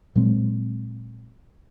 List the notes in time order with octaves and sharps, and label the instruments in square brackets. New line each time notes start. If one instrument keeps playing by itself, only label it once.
[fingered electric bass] A#2 F#3 G#3 C4